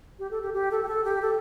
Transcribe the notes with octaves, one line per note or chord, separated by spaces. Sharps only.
G4
A4
G4
G4
A4
G4
A4
G4
A4